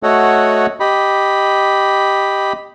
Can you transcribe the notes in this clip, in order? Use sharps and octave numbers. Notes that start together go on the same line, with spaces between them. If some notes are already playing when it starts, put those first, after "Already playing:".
A3 F#4 A4 C#5 D#5 F#5
G4 D#5 B5